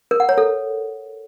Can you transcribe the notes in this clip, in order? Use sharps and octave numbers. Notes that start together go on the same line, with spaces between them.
A#4
F#5
C#5
A4